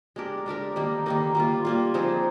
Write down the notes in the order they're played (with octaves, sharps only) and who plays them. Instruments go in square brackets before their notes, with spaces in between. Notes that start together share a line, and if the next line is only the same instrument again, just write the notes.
[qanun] G#3 D4 G4 A#4
G#3 D4 G4 A#4
D#3 G3 A#3 D#4
D#3 G3 A#3 D#4
G3 A#3 F4
G3 A#3 F4
F3 C4 D#4 G#4